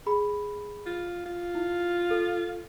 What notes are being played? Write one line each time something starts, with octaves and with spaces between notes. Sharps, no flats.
G#4 B5
F4
F4
E4
A4